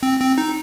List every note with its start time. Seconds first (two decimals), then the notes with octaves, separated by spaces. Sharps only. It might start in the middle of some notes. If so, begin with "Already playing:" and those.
0.03 C4
0.20 C4
0.38 D#4